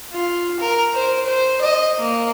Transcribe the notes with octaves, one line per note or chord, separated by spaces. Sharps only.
F4
A#4
C5
C5
D#5
A#3